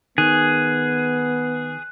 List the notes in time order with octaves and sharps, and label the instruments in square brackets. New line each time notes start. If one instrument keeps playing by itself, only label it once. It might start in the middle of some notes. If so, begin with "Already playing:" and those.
[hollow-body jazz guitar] D#3 [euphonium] B3 [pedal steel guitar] G#4 [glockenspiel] F#6